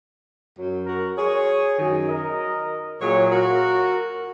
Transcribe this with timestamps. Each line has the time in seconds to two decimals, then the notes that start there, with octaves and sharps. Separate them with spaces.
0.57 F#2 F#3
0.87 F#4 A#4
1.17 G#4 C#5
1.78 F#2 D#3 F#3
2.09 A#4 D#5
3.01 A#2 F#3 G#4 C#5
3.31 F#4 A#4